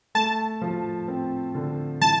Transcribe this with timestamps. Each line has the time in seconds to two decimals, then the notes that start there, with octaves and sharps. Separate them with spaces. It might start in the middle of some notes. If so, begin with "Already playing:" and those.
0.15 A3 A5
0.61 F3
1.08 C4
1.55 D3
2.01 E3 A5